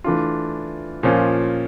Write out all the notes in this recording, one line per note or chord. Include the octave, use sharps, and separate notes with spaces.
E3 A3 D4 F4
A#2 F3 C#4